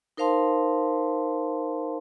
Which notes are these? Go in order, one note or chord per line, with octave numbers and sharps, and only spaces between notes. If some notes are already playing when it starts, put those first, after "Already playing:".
D#4 A#4 C5 F5 A5 C6